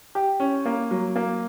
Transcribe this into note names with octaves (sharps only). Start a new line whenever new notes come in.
G4
C#4
A#3
F#3
A#3